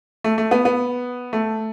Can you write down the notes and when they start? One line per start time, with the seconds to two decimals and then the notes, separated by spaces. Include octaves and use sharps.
0.24 A3
0.38 A3
0.51 B3
0.65 B3
1.33 A3